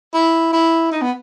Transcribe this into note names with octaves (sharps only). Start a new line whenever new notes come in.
E4
E4
D#4
B3